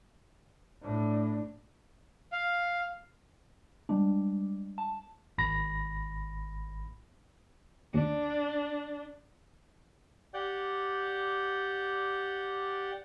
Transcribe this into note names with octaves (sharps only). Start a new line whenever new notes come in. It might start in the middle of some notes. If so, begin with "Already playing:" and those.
A2 D4
F5
G3 G#3 D4
A5
G#1 B5 A#6
D#2 D4
G4 D5 F#5 G6